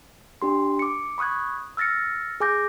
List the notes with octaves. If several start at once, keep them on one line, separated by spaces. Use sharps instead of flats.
D4 G4 C6
D6 C#7
B5 C#6 D#6 F#6 G#6
E6 F6 A6 A#6 C#7
G#4 G#5 D6 G6 A#6